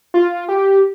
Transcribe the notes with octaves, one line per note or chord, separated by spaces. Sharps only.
F4
G4